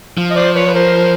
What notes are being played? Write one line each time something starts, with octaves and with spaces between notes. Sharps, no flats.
F3
D#5
C5 D5
B4 C#5
B4
A#4 C5